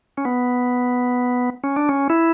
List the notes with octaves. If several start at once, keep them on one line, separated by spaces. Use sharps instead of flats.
C#4
B3
C#4
D4
C#4
E4